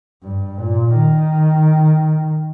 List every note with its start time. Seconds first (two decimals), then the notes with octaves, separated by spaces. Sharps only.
0.23 G2
0.59 A#2
0.95 D#3